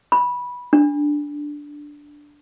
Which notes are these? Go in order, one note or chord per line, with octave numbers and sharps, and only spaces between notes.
B5
D4